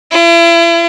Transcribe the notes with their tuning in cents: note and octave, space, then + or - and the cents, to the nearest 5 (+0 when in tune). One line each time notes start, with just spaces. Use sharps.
E4 +40